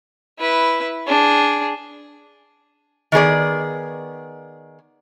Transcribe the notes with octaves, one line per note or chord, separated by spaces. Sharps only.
E4 B4
D4 G#4
D#3 B3 G#4 D5